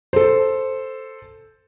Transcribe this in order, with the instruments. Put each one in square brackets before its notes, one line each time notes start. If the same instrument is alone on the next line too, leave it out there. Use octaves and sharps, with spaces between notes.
[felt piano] A4 C5